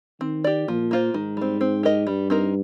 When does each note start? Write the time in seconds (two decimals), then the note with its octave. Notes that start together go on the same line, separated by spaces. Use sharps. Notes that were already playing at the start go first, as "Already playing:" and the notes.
0.21 D#3 C4
0.44 G4 D5
0.68 A#2 F3
0.91 A#3 F4 C5
1.14 G#2 D#3
1.37 G3 C4
1.61 C4
1.83 G4 A#4 D#5
2.07 G2 G3
2.30 C4 D#4 A#4